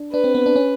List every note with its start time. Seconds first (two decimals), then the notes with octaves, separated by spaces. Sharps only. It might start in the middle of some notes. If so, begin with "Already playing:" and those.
Already playing: D4
0.13 D4 B4
0.24 C4
0.35 B3
0.46 D4
0.56 C#4